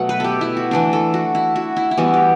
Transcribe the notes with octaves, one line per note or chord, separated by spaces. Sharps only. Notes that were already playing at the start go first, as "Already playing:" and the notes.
Already playing: B2 F#3 A3 F#5
B4
G4 A4
E4
F#4
E3 A3 D4
A4
F#4
E4
F#4
E4
E4
E3 G3 B3 F#4
G4